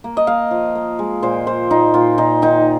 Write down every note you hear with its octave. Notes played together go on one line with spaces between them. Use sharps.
A#3
D#5
A#3 F5
F3
A#3
G#3
A#2 C5
A#2 C5
A#2 D#4
A#2 F4
A#2 D#4
D#3 D#4